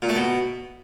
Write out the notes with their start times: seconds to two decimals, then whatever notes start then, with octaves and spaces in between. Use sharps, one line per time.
0.02 A#2
0.09 A3
0.15 B2